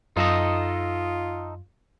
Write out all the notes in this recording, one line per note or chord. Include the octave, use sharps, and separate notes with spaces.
F#2 D#4 F4 A4 D#5